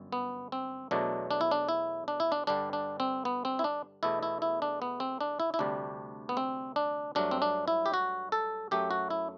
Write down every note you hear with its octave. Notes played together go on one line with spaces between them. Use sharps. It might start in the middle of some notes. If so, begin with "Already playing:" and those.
Already playing: G1 F#2
B3
C4
E2 B2 F#3 A3 D4
D4
E4
D4
E4
D4
E4
D4
G2 D3 G3 D4
D4
C4
B3
C4
E4
D4
E2 B2 A3 E4
E4
E4
D4
B3
C4
D4
E4
E4
D2 C3 G3 D4
B3
C4
D4
G2 F#3 A3 D4
C4
D4
E4
G4
F#4
A4
F#2 F#3 A3 G4
F#4
E4